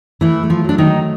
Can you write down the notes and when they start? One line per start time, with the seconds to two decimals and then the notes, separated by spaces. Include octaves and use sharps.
0.21 E3 A3 E4
0.43 A3
0.50 F3 F4
0.64 F#3 D4
0.78 D#3 D#4
0.86 A3